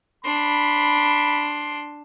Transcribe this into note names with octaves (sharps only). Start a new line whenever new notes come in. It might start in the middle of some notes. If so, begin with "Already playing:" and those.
D4 B5 C6